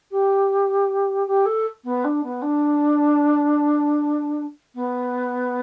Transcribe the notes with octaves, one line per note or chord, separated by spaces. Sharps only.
G4
G4
A4
B3
D4
B3
D4
B3